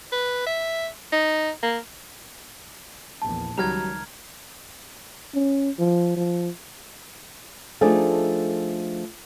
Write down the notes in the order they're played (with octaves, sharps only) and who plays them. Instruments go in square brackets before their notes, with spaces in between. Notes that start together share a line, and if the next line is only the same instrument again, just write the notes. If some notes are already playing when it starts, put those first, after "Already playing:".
[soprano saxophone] B4
E5
D#4
A#3
[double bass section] A#1 E2 [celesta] A5
[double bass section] C#2 D#3 [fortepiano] F#3 G3 [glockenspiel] A#5 F6 G#6
[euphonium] C#4
F3
F3
[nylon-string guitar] F3 A3 D4 D#4 G#4 A4